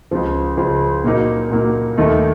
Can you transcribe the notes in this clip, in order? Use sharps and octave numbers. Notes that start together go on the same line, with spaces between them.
C#2 C#3 F3
C#2 C#3 F3
A#2 F#3 A#3 D#4
A#2 F#3 A#3 D#4
D#2 D#3 A3 D#4